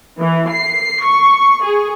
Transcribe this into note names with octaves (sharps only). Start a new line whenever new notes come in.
E3
C7
C#6
G#4